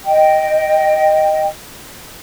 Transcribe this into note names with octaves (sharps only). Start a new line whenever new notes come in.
D#5 G5